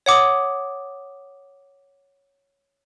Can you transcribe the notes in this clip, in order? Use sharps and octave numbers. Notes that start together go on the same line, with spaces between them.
C#5 F#5 D6 D#6